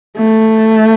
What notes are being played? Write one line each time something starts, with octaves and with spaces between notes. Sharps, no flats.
A3